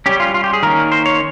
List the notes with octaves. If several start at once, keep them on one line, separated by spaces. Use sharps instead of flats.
G3 C#4 G4
F4
F4
G4
G#4
D#3 A#3 C#4 A#4
C5
C#5